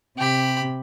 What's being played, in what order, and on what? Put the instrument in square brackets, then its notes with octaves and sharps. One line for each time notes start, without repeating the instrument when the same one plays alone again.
[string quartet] C3 [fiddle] G4 B5